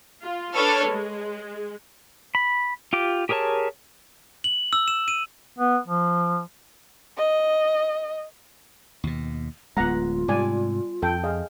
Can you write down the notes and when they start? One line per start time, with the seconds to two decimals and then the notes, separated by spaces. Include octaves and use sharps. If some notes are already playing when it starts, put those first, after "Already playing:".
0.22 F4
0.54 D4 A4 B4 C#5 F6
0.88 G#3
2.35 B5
2.93 F4 G4 D6
3.29 G4 G#4 A#4 C#5 A5
4.44 F#7
4.73 E6
4.88 E7
5.08 D#7
5.58 B3
5.87 F3
7.17 D#5
9.04 D#2 B2
9.77 D1 G#3 B3 F4 F#5 A#5
10.28 G#2 C3 G3 D5 G#5
11.02 F2 A4 G5
11.23 G#4 D#5 F5